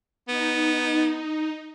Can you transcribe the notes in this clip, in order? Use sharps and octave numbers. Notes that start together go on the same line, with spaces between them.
B3 D#4